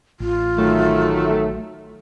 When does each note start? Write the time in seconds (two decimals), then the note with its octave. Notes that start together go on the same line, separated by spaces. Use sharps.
0.20 A1 F4
0.58 D#3 F#3 A3